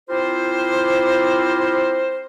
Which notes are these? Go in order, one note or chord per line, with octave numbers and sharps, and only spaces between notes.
C4 E4 F4 G4 A#4 C5